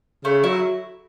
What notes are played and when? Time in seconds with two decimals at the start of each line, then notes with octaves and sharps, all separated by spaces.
0.25 C#3 A3
0.44 F#3 E4